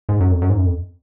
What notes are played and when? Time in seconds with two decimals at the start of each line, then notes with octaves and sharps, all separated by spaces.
0.09 G#2
0.20 F#2
0.31 F2
0.42 F#2
0.49 G#2
0.58 F#2
0.66 F2